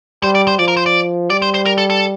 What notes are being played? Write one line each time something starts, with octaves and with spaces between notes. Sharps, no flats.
G3 C5
D5
C5
F3 D5
A#4
C5
D5
G3 D5
C5
C5
A#4
A4
A4